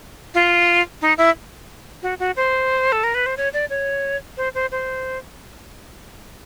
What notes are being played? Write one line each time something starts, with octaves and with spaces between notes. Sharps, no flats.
F4
D#4
E4
F#4
F#4
C5
A4
A#4
B4
C5
C#5
D5
C#5
C5
C5
C5